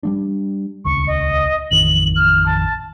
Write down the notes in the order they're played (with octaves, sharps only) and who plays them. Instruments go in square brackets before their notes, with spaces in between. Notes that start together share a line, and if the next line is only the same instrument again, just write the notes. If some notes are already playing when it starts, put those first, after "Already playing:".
[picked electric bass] G3 A3 D4
[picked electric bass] D#1 C#2 [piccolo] C#6
[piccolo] D#5
[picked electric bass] A1 F2 D#3 [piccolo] F#7
[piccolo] F6
A5